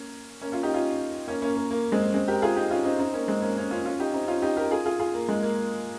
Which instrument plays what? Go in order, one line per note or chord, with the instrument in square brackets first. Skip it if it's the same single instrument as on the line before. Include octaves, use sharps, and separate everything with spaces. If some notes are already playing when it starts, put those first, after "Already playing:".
Already playing: [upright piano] A#3 C#4
A#3 C#4
C#4 F4
D#4 G4
C#4 F4
A#3 C#4
A#3 C#4
A#3
A#3
G#3 C4
G#3 C4
G4 A#4
F4 G#4
D#4 G4
C#4 F4
C4 D#4
C4 D#4
A#3 C#4
G#3 C4
A#3 C#4
A#3 C#4
C#4 F4
C#4 F4
D#4 G4
C4 D#4
C#4 F4
D#4 G4
G4 A#4
F4 G#4
F4 G#4
F4 G#4
A#3
G#3
A#3